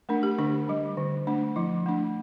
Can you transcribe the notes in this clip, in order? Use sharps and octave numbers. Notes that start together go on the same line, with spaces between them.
A3 D4 A#4
G4
D3 D4
G3 D4
D3
A3 D4
F3 E4
A3 D4